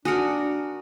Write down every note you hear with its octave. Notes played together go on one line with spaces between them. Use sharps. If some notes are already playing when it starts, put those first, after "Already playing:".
D4 F#4 A#4 G#5 D#6 C#7